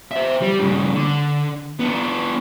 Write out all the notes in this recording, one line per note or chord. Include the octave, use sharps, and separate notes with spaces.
C5 E5
G3
G2 C#3
D3
B3 D4